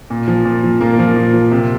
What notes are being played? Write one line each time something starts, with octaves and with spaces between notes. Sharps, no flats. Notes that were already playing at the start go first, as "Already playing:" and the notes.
A#2
F3
A#2
F3
A#2 A#3
F3
A#2
F3
C3